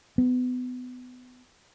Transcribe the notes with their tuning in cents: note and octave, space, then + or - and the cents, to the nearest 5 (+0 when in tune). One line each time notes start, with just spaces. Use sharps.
B3 +25